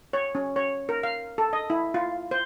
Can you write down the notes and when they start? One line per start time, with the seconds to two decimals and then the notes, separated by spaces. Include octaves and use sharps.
0.13 C#5
0.35 C#4
0.56 C#5
0.89 A#4
1.03 F5
1.38 A4
1.53 D#5
1.70 E4
1.94 F4
2.31 C5